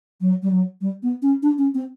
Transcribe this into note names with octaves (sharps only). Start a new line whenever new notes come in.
F#3
G3
F#3
G3
B3
C#4
D4
C#4
C4